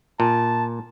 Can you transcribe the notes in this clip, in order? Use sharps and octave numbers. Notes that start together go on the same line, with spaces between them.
A#2 A5